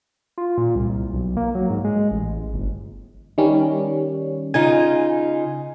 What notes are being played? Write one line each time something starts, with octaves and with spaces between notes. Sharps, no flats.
F4
A#2
C2
C2
B1
A#3
F#3
G#2
G#3
A1
G1
D#3 G3 C#4
C#3 D#4 F4 G#5